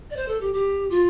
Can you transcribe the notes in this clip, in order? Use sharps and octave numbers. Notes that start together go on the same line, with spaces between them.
D5
C5
A4
G4
G4
F4